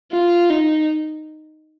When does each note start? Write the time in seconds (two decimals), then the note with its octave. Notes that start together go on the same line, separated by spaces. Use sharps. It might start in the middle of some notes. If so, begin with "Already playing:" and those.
0.12 F4
0.50 D#4